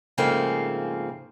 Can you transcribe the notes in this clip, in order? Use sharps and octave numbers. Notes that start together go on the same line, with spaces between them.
G#2 C#3 F3 A3 A#3 C4